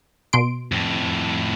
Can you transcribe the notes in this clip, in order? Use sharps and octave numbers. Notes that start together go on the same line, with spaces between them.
B2 C6 D7
F2 A2